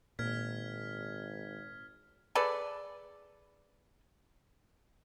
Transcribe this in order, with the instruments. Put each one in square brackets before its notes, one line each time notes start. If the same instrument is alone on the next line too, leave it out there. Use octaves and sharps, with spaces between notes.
[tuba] G#1 [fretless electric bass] A#2 [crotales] F6 G#6 B6
[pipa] G#4 A4 B4 D5